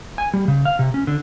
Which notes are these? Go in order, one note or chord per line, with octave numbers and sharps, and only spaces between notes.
G#5
G3
C#3
F5
C3
C#4
D3